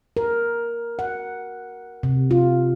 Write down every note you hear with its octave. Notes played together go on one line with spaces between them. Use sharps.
A#4
F#5
C3
F4